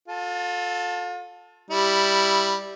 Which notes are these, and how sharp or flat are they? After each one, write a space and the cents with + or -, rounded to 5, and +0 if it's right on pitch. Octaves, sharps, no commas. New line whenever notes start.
F4 +35 A4 +0
G3 +0 E4 -5